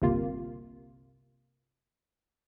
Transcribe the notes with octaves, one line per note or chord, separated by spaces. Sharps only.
G1 C2 C3 A#3 F4